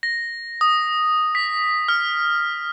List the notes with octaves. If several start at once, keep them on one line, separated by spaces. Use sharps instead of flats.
A#6
D#6
B6
F6